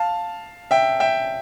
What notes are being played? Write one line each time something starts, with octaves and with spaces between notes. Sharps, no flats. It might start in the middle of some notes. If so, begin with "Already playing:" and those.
Already playing: F5 A5
E5 G5
E5 G5